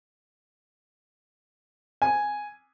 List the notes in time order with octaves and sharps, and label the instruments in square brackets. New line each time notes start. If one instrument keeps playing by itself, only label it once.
[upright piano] G#5